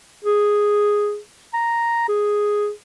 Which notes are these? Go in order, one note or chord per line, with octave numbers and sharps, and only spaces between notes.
G#4
A#5
G#4